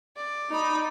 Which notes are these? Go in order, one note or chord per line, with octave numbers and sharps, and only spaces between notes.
D5
D#4 B5